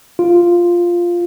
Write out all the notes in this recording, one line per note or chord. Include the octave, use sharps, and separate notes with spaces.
F4